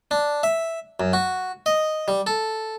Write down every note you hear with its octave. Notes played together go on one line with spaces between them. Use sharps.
D4
E5
F#2
F#4
D#5
G3
A4